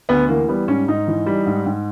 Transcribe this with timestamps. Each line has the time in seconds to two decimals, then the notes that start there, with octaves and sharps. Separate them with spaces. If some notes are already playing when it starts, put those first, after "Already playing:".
0.09 D2 B3
0.29 E3 A#3
0.49 G3 B3
0.68 G#2 C#4
0.88 G#2 D#4
1.07 E3
1.26 G3
1.47 G#2
1.66 G#2